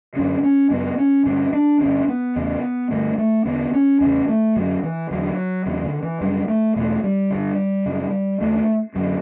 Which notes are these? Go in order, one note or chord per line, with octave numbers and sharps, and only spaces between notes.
F#2 D3 C#4
C#4
F#2 C#3 B3
C#4
G2 D3 C#4
D4
G2 D3 C#4
B3
E2 C#3
G2 D3 A3
A3
E2 D3 B3
C#4
E2 C#3 C#4
A3
F#2 D3 F#3
E3
E2 D3 F#3
E2 C#3 F#3
D3
E3
F#2 C#3 G3
A3
E2 B2 A3
G3
G2 D3
F#2 C#3
E2 D3 A3
F#2 D3 F#3